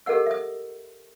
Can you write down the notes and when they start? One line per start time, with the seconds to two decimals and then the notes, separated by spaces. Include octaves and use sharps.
0.06 G4 A4 A#4 D#5 F#5 E6
0.26 E5 D#6